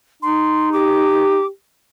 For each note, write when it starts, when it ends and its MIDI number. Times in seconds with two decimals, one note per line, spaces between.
0.22 1.41 63
0.22 0.72 84
0.73 1.48 67
0.73 1.46 86